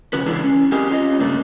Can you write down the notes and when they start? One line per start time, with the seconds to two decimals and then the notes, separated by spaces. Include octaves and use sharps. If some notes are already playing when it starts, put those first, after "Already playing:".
0.13 F2 C#3 C#4 F#4 B4
0.26 C#3 E3 G#3 D4 E4 G#4
0.44 C#4
0.72 C4 G4 G#4 A#4 D#5 G#5
0.89 C#4 F4 D#5
1.19 G2 C#3 A3 A#3 D4